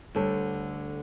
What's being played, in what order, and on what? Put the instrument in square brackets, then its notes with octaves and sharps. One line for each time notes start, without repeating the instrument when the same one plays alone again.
[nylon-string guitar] D2 D3 G3 [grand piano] A4 C#5